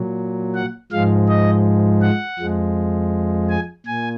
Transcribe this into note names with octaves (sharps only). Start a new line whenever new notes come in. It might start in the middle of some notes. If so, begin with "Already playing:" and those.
Already playing: A#2 F#3
F#5
G#2 F3 G#3 F5
D#5
F#5
F2 F3 G#3
G#5
A#2 G#5